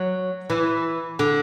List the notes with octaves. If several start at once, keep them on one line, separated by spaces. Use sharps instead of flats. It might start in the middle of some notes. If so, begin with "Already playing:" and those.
Already playing: F#3
E3
D3